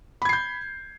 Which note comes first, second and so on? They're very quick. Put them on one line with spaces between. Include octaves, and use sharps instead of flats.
B5 G#6 C7 G6